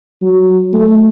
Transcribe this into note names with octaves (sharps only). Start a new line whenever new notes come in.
F#3
A3